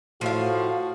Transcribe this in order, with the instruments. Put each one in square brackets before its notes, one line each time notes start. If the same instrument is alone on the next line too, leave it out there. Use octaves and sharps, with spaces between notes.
[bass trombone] A2 [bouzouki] F3 F5 [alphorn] F#4